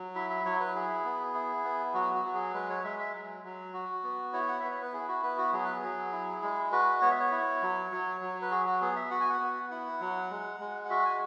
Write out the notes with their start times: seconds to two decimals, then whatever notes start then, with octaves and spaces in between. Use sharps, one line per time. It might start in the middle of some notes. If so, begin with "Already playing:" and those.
Already playing: F#3
0.15 E4 E5
0.30 E5
0.45 F#3 C#5
0.60 B4
0.75 E4 G#4
1.04 B3
1.34 E4
1.65 B3
1.94 F#3 F#4
2.14 F#4
2.25 F#3
2.34 G#4
2.54 G#3 B4
2.70 C#5
2.84 G#3 E5
2.99 E5
3.14 F#3
3.44 F#3
3.74 F#4
4.03 B3
4.33 E4 C#5
4.48 F#5
4.60 B3 E5
4.71 C#5
4.82 B4
4.93 E4 G#4
5.08 F#4
5.23 B3 B4
5.38 F#4
5.53 F#3 G#4
5.65 B4
5.75 G#4
5.82 F#3
6.12 E4
6.42 G#3
6.72 F#4 B4
7.02 B3 C#5
7.11 E5
7.20 C#5
7.32 E4
7.62 F#3
7.91 F#3
8.21 F#3
8.42 B4
8.51 F#4 G#4
8.66 F#4
8.81 B3 G#4
8.96 E5
9.11 F#4 F#5
9.20 G#5
9.30 F#5
9.41 B3
9.71 E4 F#5
10.01 F#3
10.31 G#3
10.60 G#3
10.85 F#5
10.90 F#4 E5
11.05 G#5